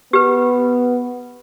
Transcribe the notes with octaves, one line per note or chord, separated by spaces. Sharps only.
B3 G4 B4